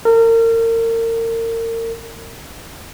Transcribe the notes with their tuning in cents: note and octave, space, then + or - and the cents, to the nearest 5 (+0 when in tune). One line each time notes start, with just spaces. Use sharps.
A#4 -35